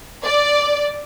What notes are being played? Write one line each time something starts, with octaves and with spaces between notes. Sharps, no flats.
D5